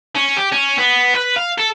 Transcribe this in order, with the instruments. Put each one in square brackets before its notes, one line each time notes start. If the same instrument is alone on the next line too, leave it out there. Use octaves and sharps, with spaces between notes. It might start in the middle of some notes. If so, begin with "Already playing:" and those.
[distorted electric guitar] C#4
G4
C#4
B3
B4
F5
A4